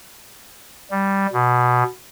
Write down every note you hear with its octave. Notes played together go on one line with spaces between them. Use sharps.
G3
B2